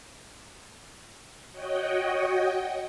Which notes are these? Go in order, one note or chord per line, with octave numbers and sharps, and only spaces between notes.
F#4 C#5 D#5 F#5 G5